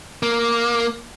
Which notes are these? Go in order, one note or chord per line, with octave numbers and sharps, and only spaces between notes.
A#3